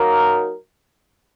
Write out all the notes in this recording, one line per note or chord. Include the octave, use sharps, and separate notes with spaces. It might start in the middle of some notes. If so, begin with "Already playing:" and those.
Already playing: F#3 A#3 D#4 A#4